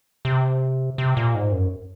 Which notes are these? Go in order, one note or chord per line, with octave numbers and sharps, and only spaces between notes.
C3
C3
A#2
G#2
F#2